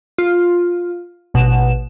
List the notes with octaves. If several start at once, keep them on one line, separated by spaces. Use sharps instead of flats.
F4
A1 B2 F#5 E7